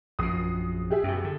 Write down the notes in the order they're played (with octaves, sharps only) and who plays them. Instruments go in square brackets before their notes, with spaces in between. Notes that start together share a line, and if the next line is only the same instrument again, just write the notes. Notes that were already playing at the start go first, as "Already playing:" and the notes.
[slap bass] A#1 F#2 [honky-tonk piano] D#6 C7
[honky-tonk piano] G4 G#4 E5
[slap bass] F#2 B2
D3